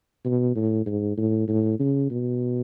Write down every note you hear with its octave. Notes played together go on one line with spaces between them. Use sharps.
B2
A2
G#2
A2
A2
C#3
B2